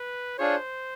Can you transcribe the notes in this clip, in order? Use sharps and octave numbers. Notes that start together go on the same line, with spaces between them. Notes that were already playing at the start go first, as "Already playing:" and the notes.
Already playing: B4
D4 F4 G#4 C5 C#5